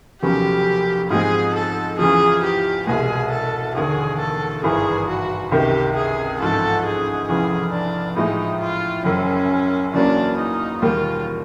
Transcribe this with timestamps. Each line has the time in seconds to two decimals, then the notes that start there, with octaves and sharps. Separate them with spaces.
0.22 F1 D#2 C#3 F#3 B3 G4
1.10 G#2 F3 G#3 C4 G#4
1.54 A4
1.99 E2 C#3 F3 G#4
2.43 G4
2.87 C2 B2 G#3 G#4
3.31 A4
3.75 E1 D#2 D3 G#4
4.19 A4
4.64 G#1 G2 E3 G#4
5.08 F#4
5.51 C#2 C3 D#3 G4
5.96 G#4
6.40 A1 G#2 F3 A4
6.85 G#4
7.28 F1 E2 C#3 E3 G#4
7.73 D4
8.16 A2 F3 G#3 D#4
8.61 F4
9.05 F#1 F#2 C#3 C#4
9.93 E2 C#3 F#3 A#3 C#4 D4
10.37 D#4
10.82 E1 D#2 D#3 G3 F4